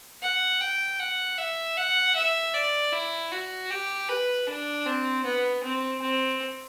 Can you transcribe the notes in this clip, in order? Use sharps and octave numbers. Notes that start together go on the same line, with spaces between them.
F#5
G5
F#5
E5
F#5
E5
D5
E4
F#4
G4
B4
D4
C4
B3
C4
C4